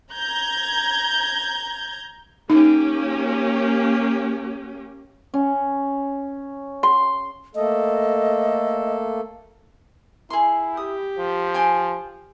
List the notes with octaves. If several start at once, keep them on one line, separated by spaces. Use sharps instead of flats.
A#5 G6 G#6
A#3 C#4 D#4 G4
C#4
C6
A3 A#3 A4 D#5
E4 G#4 C6
G4 D#6
F3
G5 G#5 C6